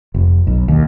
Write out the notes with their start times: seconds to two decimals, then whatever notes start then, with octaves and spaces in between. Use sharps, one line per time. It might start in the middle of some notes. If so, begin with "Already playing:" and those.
0.14 F1
0.47 B1
0.68 D#2